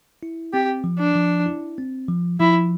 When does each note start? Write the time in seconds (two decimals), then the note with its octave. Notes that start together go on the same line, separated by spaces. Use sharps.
0.23 E4
0.53 C4 G4
0.84 F3
1.00 D4
1.15 F3
1.46 E4
1.78 C4
2.09 F3
2.40 F3 E4